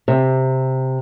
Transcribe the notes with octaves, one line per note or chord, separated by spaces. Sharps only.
C3